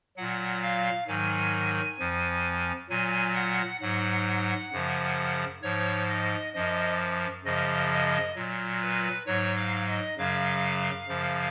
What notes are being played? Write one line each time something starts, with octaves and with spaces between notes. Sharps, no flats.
A#2 F#3 F#5
F5
G#2 D#3 F#3 G#5
F2 F3
A#2 F#3 G#5
F#5
G#2 F#3 F#5
F#2 C#3 F3
G#2 F3 C#5
D#5
F#2 F3 D#5
F#2 C#3 F3 D#5
D#5
A#2 F#3
B4
G#2 F#3 C#5
F5
D#5
F#2 C#3 F#3 F5
F#2 C#3 F3